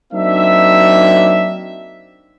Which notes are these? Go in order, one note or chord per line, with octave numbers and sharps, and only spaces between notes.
F#3 A#3 C4 D4 D#4 E5